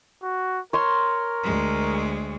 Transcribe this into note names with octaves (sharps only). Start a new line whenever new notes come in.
F#4
A#4 C#5 C6
D2 G#3